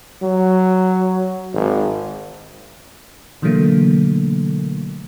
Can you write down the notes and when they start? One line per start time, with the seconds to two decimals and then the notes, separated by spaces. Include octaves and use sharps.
0.23 F#3
1.53 G#1
3.42 B2 D3 E3 F#3 A3 A#3